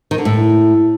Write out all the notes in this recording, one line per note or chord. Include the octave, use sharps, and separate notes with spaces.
D#3
D3
A2